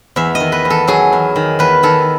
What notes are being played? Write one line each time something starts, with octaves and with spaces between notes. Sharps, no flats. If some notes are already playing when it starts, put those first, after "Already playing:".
E2 E5
D#5
D#3
B4
E2
A4
F#3 G#4
E2
D#3
E2 B4
D#3 A4